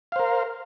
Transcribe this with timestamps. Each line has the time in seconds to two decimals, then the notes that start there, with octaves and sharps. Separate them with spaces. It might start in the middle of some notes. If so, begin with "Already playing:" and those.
0.12 F5
0.16 C5
0.19 A#4